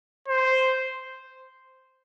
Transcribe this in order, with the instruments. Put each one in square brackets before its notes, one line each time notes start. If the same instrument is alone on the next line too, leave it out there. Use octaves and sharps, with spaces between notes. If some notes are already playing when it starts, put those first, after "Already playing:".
[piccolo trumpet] C5